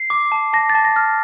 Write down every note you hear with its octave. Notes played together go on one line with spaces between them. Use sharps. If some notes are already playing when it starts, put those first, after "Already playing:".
Already playing: C7
D6
A5
A5 A#6
A6
A5
A#6
F6